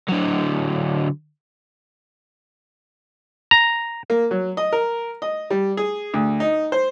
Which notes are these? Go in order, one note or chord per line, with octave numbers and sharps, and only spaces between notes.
D3 F#3
A#5
A#3
F#3
D#5
A#4
D#5
G3
G#4
D2
D#4
C5